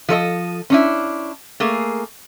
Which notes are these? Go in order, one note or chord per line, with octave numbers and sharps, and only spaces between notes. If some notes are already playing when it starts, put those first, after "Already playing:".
F3 A4 C#5 D#5
C#4 D4 E4
A3 A#3 G#4